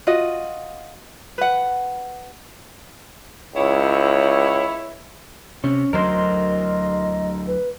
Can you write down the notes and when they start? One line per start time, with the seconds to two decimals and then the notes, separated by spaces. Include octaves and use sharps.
0.07 F4 F#4 D#5
1.38 B4 F#5
3.56 C#2 E4 C#5
5.64 C3 C#4
5.93 D2 F#3 A#4 C5 D#5 C6
7.47 B4